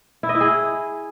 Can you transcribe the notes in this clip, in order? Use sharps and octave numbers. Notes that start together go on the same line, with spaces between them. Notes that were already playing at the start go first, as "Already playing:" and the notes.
E4
D#5
E4
G#4